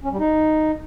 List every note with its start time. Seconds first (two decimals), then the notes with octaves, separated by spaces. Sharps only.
0.04 C#4
0.12 G3
0.19 D#4